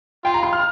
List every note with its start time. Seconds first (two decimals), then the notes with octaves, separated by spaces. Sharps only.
0.24 F4 G5
0.34 A#5
0.43 C6
0.53 F6